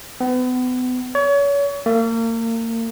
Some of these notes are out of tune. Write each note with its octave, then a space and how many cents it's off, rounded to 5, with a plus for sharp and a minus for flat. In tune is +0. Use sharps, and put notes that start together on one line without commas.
B3 +35
C#5 +35
A#3 -35